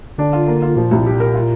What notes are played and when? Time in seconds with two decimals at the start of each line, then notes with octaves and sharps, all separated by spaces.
0.18 D3 D4
0.33 F4
0.47 A#3
0.62 F4
0.76 A#2 F3
0.91 C2
1.06 G4
1.20 A#4
1.34 F4